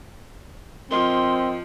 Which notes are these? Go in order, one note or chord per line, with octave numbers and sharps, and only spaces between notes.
F3 C4 A#4 D#5 C6 F6